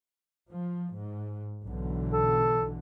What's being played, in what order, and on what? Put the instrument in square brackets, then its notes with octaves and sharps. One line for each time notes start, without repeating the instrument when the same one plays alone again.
[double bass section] F3
G#2
B1 D3 E3
[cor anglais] A4